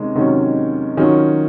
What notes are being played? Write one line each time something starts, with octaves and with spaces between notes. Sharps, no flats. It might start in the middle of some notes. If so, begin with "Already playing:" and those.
Already playing: C3 D#3 G#3 C#4
C3 D#3 F#3 C#4
D#3 F#3 C#4 F4